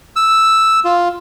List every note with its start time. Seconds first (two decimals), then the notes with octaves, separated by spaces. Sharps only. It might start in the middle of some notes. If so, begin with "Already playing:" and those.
0.16 E6
0.85 F4